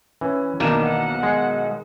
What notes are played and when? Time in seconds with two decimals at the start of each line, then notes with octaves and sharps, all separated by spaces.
0.21 E3 C#4
0.60 B1 D#3 E3 A#3 D4 E7
0.82 F#5
1.23 G#3